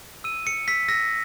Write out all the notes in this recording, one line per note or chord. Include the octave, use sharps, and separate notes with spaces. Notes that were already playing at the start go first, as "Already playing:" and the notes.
E6 D#7
E6 C#7
E6 B6
E6 A#6